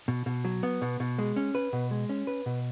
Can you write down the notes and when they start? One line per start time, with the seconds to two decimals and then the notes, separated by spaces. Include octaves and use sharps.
0.08 B2
0.26 B2
0.44 F#3
0.63 B3
0.82 B2
1.00 B2
1.18 G#3
1.36 C#4
1.55 B4
1.73 B2
1.91 G#3
2.09 C#4
2.27 B4
2.46 B2